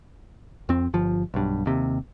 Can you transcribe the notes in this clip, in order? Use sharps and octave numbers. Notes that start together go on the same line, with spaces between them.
F2 C4
G1 F3
B1 G2
D#2 C3